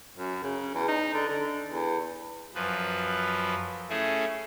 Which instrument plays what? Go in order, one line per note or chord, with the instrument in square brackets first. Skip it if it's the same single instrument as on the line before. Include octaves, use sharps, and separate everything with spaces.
[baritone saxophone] F#2
C#3
E2
D#4
D3
D3
E2
[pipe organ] F#2 F3 B4
A3 C#4 E4 G#4